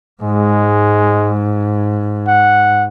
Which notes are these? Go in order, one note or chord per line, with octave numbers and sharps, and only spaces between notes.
G#2 G#3
F#5